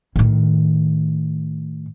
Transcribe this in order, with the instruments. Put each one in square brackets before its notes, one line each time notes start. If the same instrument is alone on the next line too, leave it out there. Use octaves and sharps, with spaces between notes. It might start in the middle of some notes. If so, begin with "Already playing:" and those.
[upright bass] A2 D#3